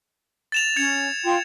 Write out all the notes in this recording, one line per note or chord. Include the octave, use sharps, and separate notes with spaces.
A6 E7 F7
C#4 G#6 C#7 F7
F4 G5 C6